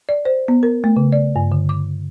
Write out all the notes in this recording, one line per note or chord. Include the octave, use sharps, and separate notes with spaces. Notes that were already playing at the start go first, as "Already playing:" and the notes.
D5
C5
B3
A#4
A3
C#3
D5
G2
D3
D6